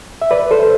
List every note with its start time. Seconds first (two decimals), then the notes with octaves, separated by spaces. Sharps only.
0.22 E5
0.31 B4 D5
0.41 B4
0.51 A4 C5